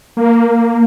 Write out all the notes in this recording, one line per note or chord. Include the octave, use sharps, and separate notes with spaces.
A#3